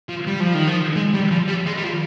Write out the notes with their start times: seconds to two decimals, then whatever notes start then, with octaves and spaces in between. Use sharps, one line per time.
0.09 F3
0.27 G3
0.40 F3
0.54 D#3
0.67 F3
0.96 G#3
1.13 G3
1.31 F3
1.48 G3
1.66 G#3
1.77 G3
1.83 F3